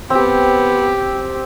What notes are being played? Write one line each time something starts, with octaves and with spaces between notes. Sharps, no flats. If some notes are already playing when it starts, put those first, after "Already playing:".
B3 C4 G4